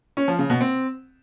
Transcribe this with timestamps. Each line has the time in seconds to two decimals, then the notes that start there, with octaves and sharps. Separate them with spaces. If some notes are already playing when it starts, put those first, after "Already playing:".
0.17 C#4
0.28 F3
0.39 C#3
0.50 B2
0.61 C4